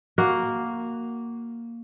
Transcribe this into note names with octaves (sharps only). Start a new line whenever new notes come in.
A#3 F#4